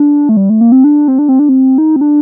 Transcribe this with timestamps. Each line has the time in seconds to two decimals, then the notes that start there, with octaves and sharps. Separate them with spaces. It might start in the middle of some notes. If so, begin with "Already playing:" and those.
Already playing: D4
0.29 A3
0.37 G3
0.49 A3
0.61 A#3
0.72 C4
0.84 D4
1.08 C4
1.19 D4
1.29 C4
1.39 D4
1.49 C4
1.78 D#4
1.96 C4
2.01 D4